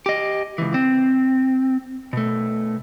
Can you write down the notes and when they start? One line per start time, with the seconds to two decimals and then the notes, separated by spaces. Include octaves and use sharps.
0.06 G4 D#5
0.58 C#2 E3
0.74 C4
2.13 B2 A3